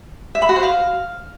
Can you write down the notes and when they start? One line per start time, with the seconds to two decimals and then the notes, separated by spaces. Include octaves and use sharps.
0.35 E5
0.42 B5
0.49 F#4
0.56 C5
0.63 F5